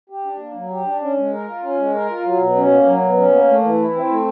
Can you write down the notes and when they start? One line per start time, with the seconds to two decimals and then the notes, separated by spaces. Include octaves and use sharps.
0.10 G4
0.25 D4
0.39 A#3
0.55 F#3
0.71 G4
0.86 D4
1.02 C#4
1.18 G#3
1.33 A#4
1.48 F4
1.63 C#4
1.78 G#3
1.94 A#4
2.10 F4
2.24 F#3
2.40 B2
2.56 C#4
2.71 A#3
2.86 F#3
3.02 B2
3.17 C#4
3.32 A#3
3.48 A3
3.63 E3
3.79 E4
3.94 C4
4.09 A3